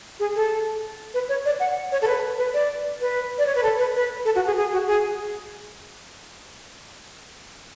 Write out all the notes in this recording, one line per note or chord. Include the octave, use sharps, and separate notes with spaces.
G#4
A4
B4
C#5
D5
F#5
C#5
A4
B4
B4
D5
B4
D5
C#5
B4
A4
B4
B4
A4
F#4
G#4
G#4
F#4
G#4